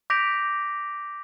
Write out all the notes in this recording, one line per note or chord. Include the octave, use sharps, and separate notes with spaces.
D6 G6 A#6 B6 D7 F7